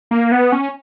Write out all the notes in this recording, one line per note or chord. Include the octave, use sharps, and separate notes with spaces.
A#3
B3
C#4